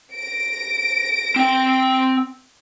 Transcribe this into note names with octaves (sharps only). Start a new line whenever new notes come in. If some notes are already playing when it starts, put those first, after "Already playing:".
A#6 D7
C4 G5